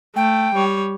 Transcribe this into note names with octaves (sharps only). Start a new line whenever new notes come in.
A3 G5
G3 C#5